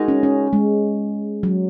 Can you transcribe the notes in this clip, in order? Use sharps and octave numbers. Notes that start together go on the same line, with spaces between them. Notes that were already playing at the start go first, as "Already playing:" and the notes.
Already playing: G#3 D#4 F#4 A#4
C#4
C#4
G#3
F#3